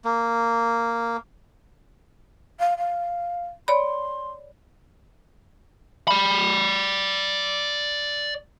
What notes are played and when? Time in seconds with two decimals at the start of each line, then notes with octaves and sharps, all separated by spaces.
0.05 A#3
2.60 F5
2.78 F5
3.68 C#5 D5 B5 C6
6.08 D5 B5